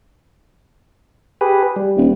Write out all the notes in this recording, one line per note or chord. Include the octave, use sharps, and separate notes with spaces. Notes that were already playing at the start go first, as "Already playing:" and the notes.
G4 G#4 B4
G3
D#1